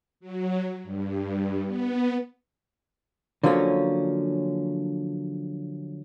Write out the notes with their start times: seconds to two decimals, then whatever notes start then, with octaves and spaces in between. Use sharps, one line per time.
0.20 F#3
0.83 G2
1.66 B3
3.43 D3 F3 F#3 A#3 C4 C#4